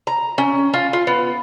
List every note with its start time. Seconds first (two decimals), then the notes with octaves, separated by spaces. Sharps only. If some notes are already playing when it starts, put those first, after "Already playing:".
0.07 A#5
0.38 C#4
0.74 F4
0.93 F4
1.07 B3